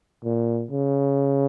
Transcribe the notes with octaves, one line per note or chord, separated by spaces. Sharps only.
A#2
C#3